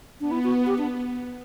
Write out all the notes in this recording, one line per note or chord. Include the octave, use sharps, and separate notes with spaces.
B3 D4
E4
F#4
G4
D4